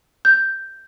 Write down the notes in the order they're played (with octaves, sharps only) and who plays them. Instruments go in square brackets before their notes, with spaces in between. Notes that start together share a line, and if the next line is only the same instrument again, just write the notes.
[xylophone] G6